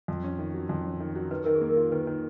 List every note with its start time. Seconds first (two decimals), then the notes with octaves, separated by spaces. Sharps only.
0.08 F2
0.24 C#4
0.39 D#3
0.54 F#3
0.69 F2
0.85 C#4
1.00 D#3
1.15 F#3
1.31 D#3 B4
1.44 D#3 A#4
1.55 G#4
1.61 A#3
1.69 A#4
1.76 F4
1.92 D#3 B4
2.07 D#3